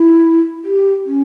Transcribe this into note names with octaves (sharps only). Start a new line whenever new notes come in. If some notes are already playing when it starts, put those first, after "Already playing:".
Already playing: E4
G4
C#4